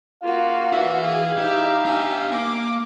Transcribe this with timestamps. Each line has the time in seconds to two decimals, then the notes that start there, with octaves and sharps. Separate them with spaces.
0.23 A#3 F4 F#4 F5
0.73 E4 B4 E5
1.03 G#4 F5
1.38 D#4 E4 G4 E5
1.86 D4 G4 E5 G#5
2.32 A#3 D6